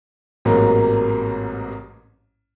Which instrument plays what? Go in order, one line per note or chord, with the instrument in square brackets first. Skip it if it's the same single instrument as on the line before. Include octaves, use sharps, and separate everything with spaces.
[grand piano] A1 G#2 C3 F#3 A#3 A#4